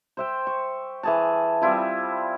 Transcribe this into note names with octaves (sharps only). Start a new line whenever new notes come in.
C5 E5 G5
C#6
E3 G#4 A5
G3 C4 E4 F4